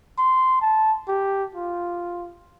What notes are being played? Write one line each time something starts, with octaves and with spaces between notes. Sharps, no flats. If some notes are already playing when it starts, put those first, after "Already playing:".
C6
A5
G4
F4